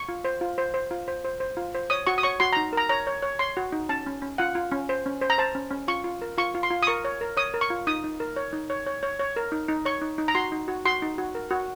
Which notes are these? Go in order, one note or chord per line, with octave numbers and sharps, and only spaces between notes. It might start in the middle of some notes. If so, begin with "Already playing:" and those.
Already playing: C#6
F4
C5
F4
C5
C5
F4
C5
C5
C5
F4
C5
C#5 D#6
F#4 C#6
D#6
C#5 C#6
F#4 C6
D#4 A#5
A#4 A#5
C#5 A#5
C#5
C#5
C#5 C6
F#4
D#4
C#4 A5
C#4
C#4
F4 F#5
F4
C#4
C5
C#4
C5
A#5
C5 A5
C#4
C#4
F4 C#6
F4
A#4
F4 C#6
F4
C6
F4
D#6
A#4 C#6
C#5
A#4
C#5 D#6
A#4
C#6
F4
D#4 D#6
D#4
A#4
C#5
D#4
C#5
C#5
C#5
C#5
A#4
D#4
D#4
C#5 C#6
D#4
D#4
A#5
F#4 C6
D#4
F#4
F#4 C6
D#4
F#4
A#4
F#4